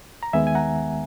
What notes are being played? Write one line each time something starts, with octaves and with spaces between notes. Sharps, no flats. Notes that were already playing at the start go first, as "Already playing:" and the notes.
A#5
D#2 D#3 G#3 B3 E5 G#5
G#5
F#5 A#5